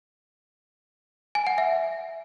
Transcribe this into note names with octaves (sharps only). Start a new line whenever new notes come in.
G#5
F#5
E5